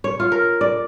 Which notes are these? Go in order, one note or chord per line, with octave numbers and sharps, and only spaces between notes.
C#5
F4
A#4
D5